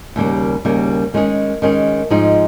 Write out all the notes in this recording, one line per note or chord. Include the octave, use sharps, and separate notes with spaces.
D#2 C#3 G3 A#3
D#2 C#3 G3 A#3
D#3 G#3 C#4 G#4
D#3 G#3 C#4 G#4
G#2 F3 G#3 D#4 G#4